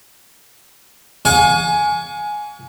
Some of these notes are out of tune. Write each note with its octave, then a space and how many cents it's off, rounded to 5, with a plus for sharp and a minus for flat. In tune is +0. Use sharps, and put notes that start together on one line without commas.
F5 +45 G#5 +10 C#6 +35